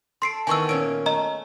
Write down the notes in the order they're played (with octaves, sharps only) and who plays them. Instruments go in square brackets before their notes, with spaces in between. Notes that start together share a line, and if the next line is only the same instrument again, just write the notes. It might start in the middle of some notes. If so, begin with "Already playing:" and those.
[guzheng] A4 [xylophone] C6 C7 D7
[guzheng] D#3 E3 B3 [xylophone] G#5 C#6 E6
[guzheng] A#2 C#4 [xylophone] D7
[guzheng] A3 [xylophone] D#5 A#5